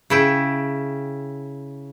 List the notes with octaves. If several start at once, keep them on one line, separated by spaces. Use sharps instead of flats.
C#3 E4 G5